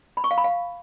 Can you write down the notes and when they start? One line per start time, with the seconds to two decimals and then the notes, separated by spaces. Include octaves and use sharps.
0.17 B5
0.24 C#6
0.31 F5
0.38 B5
0.44 F5